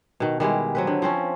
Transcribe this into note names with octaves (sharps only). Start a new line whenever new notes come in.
B2 D#3
D#3 G3 G#3 E4
F#3 C4 B4
D3
F3 C4 C#4